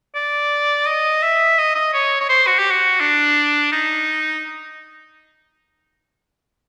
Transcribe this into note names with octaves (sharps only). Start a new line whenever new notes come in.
D5
D#5
E5
D#5
D#5
C#5
C#5
C5
F#4
G4
F#4
D4
D#4